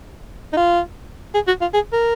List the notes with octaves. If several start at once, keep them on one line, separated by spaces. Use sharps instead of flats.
D#4
F4
G#4
F#4
F4
G#4
A#4